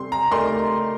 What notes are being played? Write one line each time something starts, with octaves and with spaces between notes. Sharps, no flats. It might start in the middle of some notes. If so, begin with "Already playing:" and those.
Already playing: C3 G3 C4 A4 C6
A#5
A3 D#4 G4 A#4 D5 C6